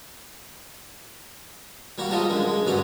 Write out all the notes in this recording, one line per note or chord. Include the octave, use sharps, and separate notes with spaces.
G3 A#3 F#4
F3 G3 G#3 A4 D#5
F#2 D3 G#3
G#3
G2 D3 F#3 C#4 D5